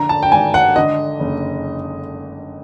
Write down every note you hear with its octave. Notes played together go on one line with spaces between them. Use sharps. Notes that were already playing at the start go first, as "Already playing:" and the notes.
Already playing: A#1 D3 A#5
A5
G5
G#1 G#5
F#5
D3 D#5
F#1